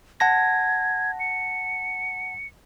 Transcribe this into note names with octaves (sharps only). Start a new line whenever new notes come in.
F#5 A5 G#6 A#6
C#7